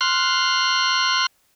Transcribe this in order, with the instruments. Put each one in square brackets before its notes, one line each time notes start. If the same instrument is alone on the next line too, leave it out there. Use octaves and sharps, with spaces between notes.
[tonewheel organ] C6 F6 F#6